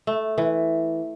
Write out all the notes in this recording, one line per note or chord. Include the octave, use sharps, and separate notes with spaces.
A3
E3